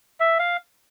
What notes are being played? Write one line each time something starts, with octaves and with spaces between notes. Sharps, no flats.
E5
F5